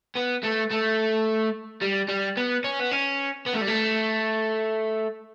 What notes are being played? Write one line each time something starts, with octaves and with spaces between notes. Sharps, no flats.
B3
A3
A3
G3
G3
B3
C#4
B3
C#4
B3
A3
G3
A3